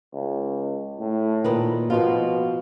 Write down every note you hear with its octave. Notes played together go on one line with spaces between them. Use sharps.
C#2
A2
A#2 D#3 B4
B2 F3 F4